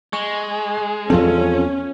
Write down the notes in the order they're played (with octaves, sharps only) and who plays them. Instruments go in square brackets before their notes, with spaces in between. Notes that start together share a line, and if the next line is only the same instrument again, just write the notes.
[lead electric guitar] G#3 [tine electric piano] C#6
[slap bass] E2 F3 C4 [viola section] C#4 [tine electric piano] F4 A4